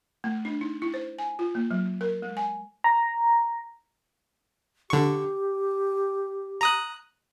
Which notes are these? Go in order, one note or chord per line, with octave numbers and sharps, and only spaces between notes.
A3
D4
D#4
E4
C5
G#5
F4
A#3
F#3
A#4
G#3
G#5
A#5
D3 G4 C#6
A#5 D#6 F#6